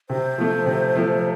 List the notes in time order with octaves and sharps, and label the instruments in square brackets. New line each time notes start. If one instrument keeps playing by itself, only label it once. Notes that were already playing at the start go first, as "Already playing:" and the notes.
[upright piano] C3 [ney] C5
[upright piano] F3 A3
C3
F3 A3